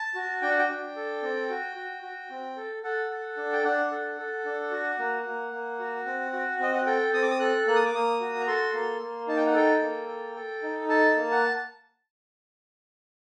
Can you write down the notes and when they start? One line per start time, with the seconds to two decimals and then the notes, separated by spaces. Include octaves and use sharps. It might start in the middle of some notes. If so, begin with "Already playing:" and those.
Already playing: A5
0.15 F#4
0.42 D4 G5
0.50 F#5
0.59 G5
0.70 D4
0.96 A4
1.23 C4
1.50 F#4
1.76 F#4
2.03 F#4
2.31 C4
2.56 A4
2.83 A4 F#5
3.10 A4
3.37 D4
3.53 G5
3.64 D4 F#5
3.91 A4
4.18 A4
4.45 D4
4.71 F#4
4.99 A#3
5.26 A#3
5.52 A#3
5.80 F#4
6.06 C4
6.33 F#4
6.60 C4 D#5
6.74 F#5
6.86 A4 G5
7.14 C4 D#6
7.22 D6
7.31 D#6
7.40 A4 F#6
7.67 A#3 F#6
7.76 D#6
7.86 D6
7.93 A#3 D#6
8.21 F#4
8.40 A#5
8.47 A4 C6
8.74 A#3
9.01 A#3
9.28 D#4 A5
9.37 G5
9.46 F#5
9.54 A4 G5
9.82 A#3
10.09 A4
10.36 A4
10.63 D#4
10.89 A4 A5
11.16 A#3
11.31 F#5